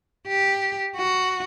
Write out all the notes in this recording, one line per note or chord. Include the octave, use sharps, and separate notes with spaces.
G4
F#4